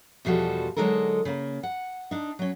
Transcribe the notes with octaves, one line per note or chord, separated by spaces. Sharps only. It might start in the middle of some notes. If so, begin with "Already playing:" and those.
E2 B2 F3 G3 F#4 A4
D3 F#3 G#3 D#4 A4 A#4
C#3 A#3
F#5
D4 D#4
F#3 C#4